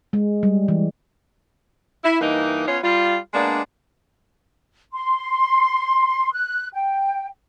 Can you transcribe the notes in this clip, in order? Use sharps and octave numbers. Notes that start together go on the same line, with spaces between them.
G#3
G3
E3
E4
G2 E3 A#3 D#4
B3 C#4 F4 C#5
G3 F4
G#3 A#3 B3 D4
C6
F#6
G5